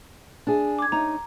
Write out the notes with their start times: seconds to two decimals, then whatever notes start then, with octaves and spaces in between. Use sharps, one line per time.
0.47 D4 G#4
0.79 D6 G#6
0.92 D#4 C#5 A#5